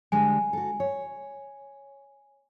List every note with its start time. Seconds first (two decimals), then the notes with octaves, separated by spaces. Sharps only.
0.12 D3 G3 G#3 G#5
0.53 F#4 A4
0.80 C#5